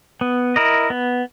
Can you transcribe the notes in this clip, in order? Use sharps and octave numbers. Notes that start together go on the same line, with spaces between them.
B3
E4 A#4 D#5
B3